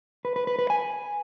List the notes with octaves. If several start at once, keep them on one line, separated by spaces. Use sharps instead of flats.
B4
B4
B4
B4
G#5